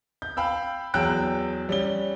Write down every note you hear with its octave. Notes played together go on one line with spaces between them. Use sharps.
G6
F5 G5 B5 E6
E2 F#3 G5 E6 F#6 D7
G3 C#4 G7